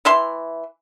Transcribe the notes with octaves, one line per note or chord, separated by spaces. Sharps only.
E3 E5 C6